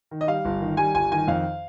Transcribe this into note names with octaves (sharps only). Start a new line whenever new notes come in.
D#3
D#5
G3 F5
G1
D#3
G3 G#5
G1 G#5
D#3 G#5
F2 F5